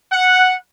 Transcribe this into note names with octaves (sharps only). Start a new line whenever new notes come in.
F#5